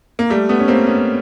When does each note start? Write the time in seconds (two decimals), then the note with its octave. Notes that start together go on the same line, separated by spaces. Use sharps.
0.19 A#3
0.30 G3 A3
0.49 A3 B3
0.59 C#4
0.68 A#3 C4
0.87 B3 C#4